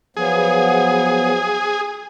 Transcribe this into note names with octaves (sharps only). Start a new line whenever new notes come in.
F3 F#3 B3 G#4